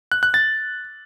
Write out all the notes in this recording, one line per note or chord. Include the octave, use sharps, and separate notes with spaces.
F#6
F#6
A6